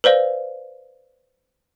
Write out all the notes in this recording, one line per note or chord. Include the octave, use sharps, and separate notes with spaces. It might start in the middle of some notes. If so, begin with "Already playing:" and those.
B4 C5 D5 F5